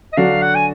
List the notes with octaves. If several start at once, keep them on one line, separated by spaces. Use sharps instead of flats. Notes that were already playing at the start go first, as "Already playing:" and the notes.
D#5
D3 F#3 D4 F#4 F5
F#5
G#5